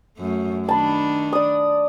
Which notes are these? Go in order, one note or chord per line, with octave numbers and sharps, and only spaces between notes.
F#2 A3
D#3 D4 A5 B5 C6
D5 D#6